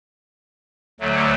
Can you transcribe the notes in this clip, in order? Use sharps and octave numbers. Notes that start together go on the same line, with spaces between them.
D2 D3 F#3 A3